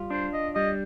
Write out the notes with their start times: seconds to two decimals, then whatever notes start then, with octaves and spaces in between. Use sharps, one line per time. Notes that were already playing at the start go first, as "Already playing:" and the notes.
Already playing: G3 F4
0.10 D4 C5
0.33 D#5
0.55 G3 D#5